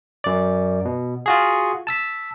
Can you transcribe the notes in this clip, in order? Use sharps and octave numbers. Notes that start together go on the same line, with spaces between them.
F#2 D5
B2
F4 F#4 G#4
A5 E6 B6